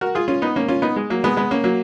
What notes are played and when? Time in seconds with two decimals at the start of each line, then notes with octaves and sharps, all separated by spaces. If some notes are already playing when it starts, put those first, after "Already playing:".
0.01 F#4 A#4
0.15 F4 G#4
0.28 C#4 F4
0.42 B3 D#4
0.56 A#3 C#4
0.68 C#4 F4
0.82 B3 D#4
0.96 G#3
1.10 F#3 A#3
1.24 G#3 B3
1.36 G#3 B3
1.51 A#3 C#4
1.64 F#3 A#3